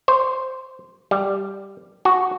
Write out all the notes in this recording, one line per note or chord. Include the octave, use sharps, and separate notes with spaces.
C5
G3
F#4